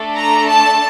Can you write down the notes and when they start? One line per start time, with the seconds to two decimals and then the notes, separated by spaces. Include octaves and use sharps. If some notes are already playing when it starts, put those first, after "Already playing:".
Already playing: A3 D4 A4
0.15 A#5
0.48 A5